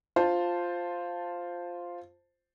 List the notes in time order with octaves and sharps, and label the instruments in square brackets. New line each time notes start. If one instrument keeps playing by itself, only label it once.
[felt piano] F4 C5 A5